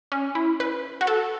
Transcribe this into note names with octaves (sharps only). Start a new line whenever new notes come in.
C#4
E4
B4
F#4
A4